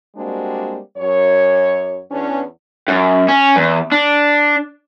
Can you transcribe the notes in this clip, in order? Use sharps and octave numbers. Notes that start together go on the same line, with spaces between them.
G3 G#3 A#3 C4 D4 F#4
F#2 C#5
E2 C#4 D4
F#2
C#4
E2
D4